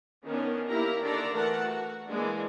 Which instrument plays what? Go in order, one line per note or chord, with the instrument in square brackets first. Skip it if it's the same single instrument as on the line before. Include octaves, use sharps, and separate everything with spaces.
[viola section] D#3 B3 C#4 D4
A#3 E4 G4 A#4 A#5
D3 D#3 D4 A4 D5 A#5
E3 A3 A#4 F#5 A5
F#4
E3 G#3 A#3 D4